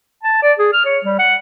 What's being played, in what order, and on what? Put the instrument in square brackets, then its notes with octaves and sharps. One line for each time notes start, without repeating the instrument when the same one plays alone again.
[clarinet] A5
D5
G#4
F6
C#5
G3
F#5